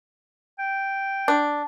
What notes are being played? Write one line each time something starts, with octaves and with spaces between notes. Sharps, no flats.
G5
D4